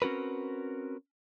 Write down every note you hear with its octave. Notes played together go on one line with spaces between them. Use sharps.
C4 C#4 F#4 A#4 B4